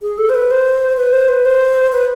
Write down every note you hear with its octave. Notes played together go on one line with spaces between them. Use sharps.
G#4
A4
C5
B4
C5
B4
C5
B4
C5
B4